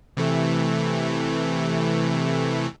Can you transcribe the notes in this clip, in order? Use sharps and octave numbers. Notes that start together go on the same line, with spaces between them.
C3 E3 A3